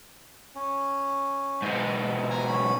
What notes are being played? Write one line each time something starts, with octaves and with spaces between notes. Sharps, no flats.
C#4
G#2 B2
G#5 A#5
C#4 B5